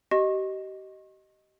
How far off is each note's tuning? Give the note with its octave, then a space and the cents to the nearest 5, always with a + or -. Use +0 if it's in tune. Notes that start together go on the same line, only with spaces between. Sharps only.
G4 -35 D#5 +0 C#6 -35